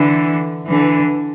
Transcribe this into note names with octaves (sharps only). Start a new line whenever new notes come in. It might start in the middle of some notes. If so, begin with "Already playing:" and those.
Already playing: D3 E3
D3 E3